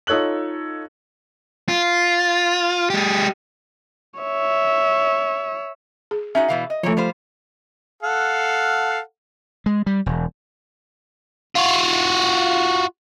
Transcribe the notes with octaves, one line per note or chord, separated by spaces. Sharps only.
D#4 F4 A4 C#5 F#6 F#7
F4
G#3 G4
C#5 E5
G#4
C#4 D#4 F#4 E5
B2 E3 F5
D#5
E3 F3 A3 A#3 C#5
G3 F4 C5
A4 F5 F#5
G#3
G3
E1
F4 F#4